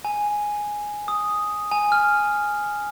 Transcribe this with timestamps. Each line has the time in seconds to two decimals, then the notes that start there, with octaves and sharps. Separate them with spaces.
0.05 G#5
1.08 D#6
1.71 G#5
1.92 F6